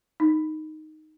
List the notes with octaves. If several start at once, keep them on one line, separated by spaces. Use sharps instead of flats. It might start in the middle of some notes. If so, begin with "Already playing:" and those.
D#4